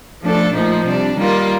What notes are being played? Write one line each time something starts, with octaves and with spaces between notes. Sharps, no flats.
F3 A3 D4 A4
A#2 F3 A3 D#4
C3 G3 D4
D#3 G3 A#3 F4